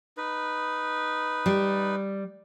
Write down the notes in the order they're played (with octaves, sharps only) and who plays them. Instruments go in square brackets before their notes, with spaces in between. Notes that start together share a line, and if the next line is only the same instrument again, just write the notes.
[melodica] D#4 B4
[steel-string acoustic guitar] G3